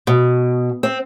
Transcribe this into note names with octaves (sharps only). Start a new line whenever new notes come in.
B2
C4